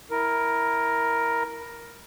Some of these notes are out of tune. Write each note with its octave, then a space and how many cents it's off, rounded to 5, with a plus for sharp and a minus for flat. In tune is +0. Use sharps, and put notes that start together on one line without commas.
E4 -15 A#4 +5